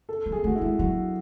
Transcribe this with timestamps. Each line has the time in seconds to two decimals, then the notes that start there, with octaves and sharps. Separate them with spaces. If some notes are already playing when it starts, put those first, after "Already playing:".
0.09 A4
0.26 F#3
0.32 G#4
0.44 A3 F#4
0.56 E4
0.62 G#3
0.79 F#3 F#4